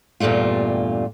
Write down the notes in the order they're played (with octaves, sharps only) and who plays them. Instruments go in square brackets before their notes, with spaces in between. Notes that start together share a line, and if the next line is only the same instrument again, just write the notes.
[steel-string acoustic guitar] E2 G2 A#2 G3 A3 F4